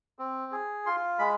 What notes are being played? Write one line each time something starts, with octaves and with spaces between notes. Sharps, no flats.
C4
G#4
F4 C6
G#3 B5